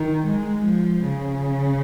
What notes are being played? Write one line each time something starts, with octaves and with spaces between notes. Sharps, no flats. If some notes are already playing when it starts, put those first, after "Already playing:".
Already playing: D#3
G#3
F3
C#3